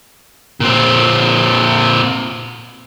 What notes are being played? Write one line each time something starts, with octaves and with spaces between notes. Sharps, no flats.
A#2 C4